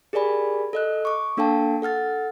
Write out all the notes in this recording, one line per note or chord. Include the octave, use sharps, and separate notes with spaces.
G4 G#4 A#4 D5 G#5 B5
A4 D#5 F#6
C#6 D6
A#3 D4 A4 F5 G5 A5
A4 F#5 F6 A6